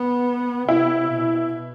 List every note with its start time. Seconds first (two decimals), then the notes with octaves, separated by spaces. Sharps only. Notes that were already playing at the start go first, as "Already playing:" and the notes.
Already playing: B3
0.68 C3 E4
1.10 B2